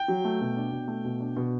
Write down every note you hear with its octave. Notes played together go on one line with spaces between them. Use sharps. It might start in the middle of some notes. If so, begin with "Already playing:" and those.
Already playing: G5
F#3
A3
B2
D4
B2
A3
B2
D4
B2